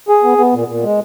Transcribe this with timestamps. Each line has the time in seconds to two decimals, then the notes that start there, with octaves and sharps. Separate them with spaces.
0.09 G#4
0.24 B3
0.38 B3
0.54 A#2
0.68 A#2
0.83 G#3